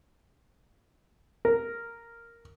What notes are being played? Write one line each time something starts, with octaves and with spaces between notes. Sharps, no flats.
A#4